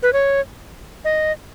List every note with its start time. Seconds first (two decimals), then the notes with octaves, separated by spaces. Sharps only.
0.03 B4
0.13 C#5
1.05 D#5